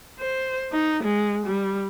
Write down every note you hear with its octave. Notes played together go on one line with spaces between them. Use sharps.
C5
D#4
G#3
G3